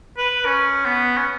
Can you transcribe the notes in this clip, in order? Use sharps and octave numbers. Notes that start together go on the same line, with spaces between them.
B4
C#4
B3
C#4